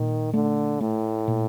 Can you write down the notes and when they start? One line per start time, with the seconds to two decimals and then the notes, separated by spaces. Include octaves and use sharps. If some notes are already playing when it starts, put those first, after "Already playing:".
Already playing: A#2 D#3
0.33 D3 A3
0.81 A2 A3
1.28 A#2